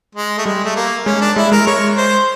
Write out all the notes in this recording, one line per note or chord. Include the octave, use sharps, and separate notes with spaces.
G#3
A3
G3 G#3
A3
A#3
G#3 C#4
D4
G#3 E4
G#3 A#4
G#3 C#5
C5